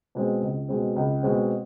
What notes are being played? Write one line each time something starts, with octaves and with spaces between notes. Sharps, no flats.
B2 G#3 C4
C#2
B2 G#3 C4
C#2
B2 G#3 C4